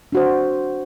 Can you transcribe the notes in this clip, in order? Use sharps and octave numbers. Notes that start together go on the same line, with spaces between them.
D4 F#4 C5